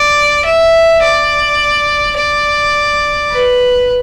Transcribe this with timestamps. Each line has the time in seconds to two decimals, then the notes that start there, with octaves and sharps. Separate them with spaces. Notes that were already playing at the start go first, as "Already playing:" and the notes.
Already playing: D5
0.45 E5
1.02 D5
2.16 D5
3.31 B4